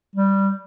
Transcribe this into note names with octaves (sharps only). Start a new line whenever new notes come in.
G3